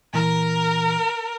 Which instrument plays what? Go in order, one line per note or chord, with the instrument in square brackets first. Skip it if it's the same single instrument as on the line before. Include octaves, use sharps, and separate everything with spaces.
[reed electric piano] A#2 E3 [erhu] A#4